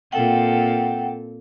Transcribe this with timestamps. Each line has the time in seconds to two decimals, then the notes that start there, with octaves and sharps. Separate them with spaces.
0.12 A#2 C4 A4 F#5 G5